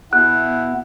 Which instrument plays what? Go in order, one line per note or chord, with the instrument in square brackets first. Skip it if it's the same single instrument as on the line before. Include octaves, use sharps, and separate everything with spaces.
[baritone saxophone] B2 [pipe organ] B3 [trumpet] E4 [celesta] F#6